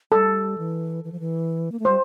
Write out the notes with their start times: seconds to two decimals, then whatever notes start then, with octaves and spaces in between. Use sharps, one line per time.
0.12 G3 A4
0.58 E3
1.04 E3
1.12 F3
1.20 E3
1.72 A#3
1.79 A3
1.85 G3 C5